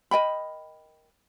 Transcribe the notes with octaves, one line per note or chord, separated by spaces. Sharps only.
A#4 D#5 G5 B5